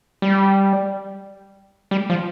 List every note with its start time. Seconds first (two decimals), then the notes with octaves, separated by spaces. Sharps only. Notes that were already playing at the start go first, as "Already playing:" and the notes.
0.22 G3
1.91 G3
2.10 F3